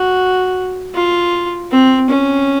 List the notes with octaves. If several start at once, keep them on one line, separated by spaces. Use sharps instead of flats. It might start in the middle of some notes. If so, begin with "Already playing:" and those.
Already playing: F#4
F4
C4
C#4